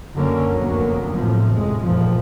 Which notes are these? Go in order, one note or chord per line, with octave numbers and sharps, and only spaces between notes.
F#2 D3 F#3 A#3 C#4
F1 D2 F#3 A#3 B3
A2 C3 F3
F1 A2 G#3
F1 F2 A#2 E3 F3